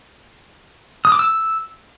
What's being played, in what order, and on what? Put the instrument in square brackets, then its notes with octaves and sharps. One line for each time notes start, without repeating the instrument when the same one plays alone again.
[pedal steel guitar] D#6
D6
E6